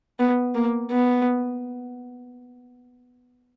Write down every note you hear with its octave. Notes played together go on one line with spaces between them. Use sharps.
B3
A#3
B3